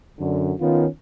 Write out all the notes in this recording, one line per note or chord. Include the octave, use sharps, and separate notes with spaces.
F#2 D3
D#3 B3 C#4 F4